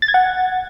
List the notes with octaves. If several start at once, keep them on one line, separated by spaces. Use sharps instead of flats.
A6
G#6
F#5